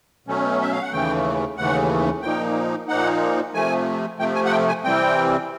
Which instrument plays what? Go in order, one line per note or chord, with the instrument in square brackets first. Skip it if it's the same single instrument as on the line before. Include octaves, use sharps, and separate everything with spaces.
[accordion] B2 F#3 A3 C#4
E5
F5
F#5
D#2 C#3 E3 A3 G5
D#2 C#3 E3 A3 F#5
A#2 F3 A#3 D#4 G5
A#2 F3 A#3 D#4 F#5
C3 F3 A3 G#5
C3 F3 A3 G5
G#5
F#5
G5
G#5
C3 E3 G3 C4 G5